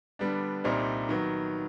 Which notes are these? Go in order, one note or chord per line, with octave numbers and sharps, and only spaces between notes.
D3 G3 B3 D4
C2 A#2 G3 C4 D#4
D#3 F#3 B3